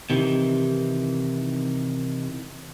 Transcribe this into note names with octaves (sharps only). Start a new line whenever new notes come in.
C3 D#3 E3